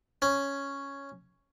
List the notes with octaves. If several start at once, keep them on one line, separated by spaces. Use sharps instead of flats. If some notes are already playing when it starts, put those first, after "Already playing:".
C#4